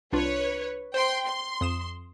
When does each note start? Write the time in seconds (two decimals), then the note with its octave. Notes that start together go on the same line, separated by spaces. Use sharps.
0.13 C2 D4 F4 B4 C#5
0.94 C5 G5 C6
1.26 C6
1.61 F2 D#6 E7